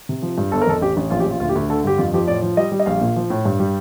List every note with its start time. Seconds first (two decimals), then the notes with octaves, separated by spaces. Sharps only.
0.09 C3
0.22 F3
0.38 G2
0.52 G1 A4
0.62 A#4
0.67 F2 A4
0.81 A1 G4
0.97 A1
1.11 A#1 F4
1.20 G4
1.26 A#1 F4
1.40 D2 F4
1.49 G4
1.55 D2
1.69 D3 A4
1.84 G2 G4
1.98 F2 F4
2.14 F3 G4
2.28 A2 D5
2.42 F3
2.57 G3 D#5
2.72 G3
2.80 D#5
2.86 A#1 F5
3.01 A#2
3.16 F3
3.30 A2
3.45 G2
3.60 G3